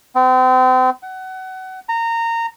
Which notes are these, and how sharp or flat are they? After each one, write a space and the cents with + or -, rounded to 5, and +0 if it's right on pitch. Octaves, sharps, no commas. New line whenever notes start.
C4 -35
F#5 +25
A#5 -20